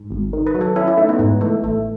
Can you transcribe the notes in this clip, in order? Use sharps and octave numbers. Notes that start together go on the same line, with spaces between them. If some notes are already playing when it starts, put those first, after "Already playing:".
Already playing: G#2
G#1
D#3
B4
F#3
A4
C#4 E4
E4
A3 D#4
B3
G#2 G#3
E3 A3
A1 A3